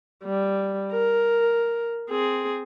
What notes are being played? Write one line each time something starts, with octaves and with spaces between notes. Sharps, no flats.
G3
A#4
C4 G#4